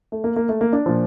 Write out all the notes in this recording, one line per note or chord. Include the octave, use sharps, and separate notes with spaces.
A3
A#3
A#3
A3
A#3
D4
A#2 F3